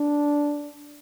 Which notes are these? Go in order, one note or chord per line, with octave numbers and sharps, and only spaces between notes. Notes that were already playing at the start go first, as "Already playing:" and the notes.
Already playing: D4